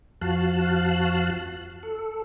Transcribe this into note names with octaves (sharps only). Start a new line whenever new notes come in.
F2 F3 F#4 F5 A5 F#6
A4